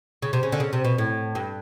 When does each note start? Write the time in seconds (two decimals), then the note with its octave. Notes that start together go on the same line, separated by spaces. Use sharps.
0.22 C#3
0.33 C3
0.43 C#3
0.52 D3
0.60 C#3
0.73 C3
0.85 B2
0.98 A2
1.35 G2